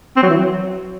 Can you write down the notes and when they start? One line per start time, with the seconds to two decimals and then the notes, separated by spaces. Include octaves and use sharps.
0.16 C4
0.23 F#3
0.30 E3
0.36 F#3